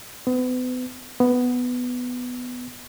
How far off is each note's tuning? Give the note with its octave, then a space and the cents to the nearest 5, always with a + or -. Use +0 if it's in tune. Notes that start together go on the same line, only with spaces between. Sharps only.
B3 +35
B3 +5